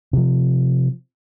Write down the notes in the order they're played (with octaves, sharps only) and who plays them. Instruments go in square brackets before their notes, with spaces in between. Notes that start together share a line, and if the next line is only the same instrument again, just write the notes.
[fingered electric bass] C3 F3